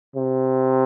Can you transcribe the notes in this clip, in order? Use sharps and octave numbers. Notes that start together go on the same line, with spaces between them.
C3